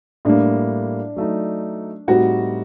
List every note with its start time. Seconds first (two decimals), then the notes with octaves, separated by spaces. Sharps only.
0.25 A2 G3 A#3 D4
1.16 F#3 A3 D#4
2.08 A2 G3 C4 D#4 F#4